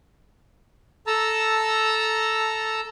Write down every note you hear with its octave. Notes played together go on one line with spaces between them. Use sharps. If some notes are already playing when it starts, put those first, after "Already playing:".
A4 A5 A#5 E6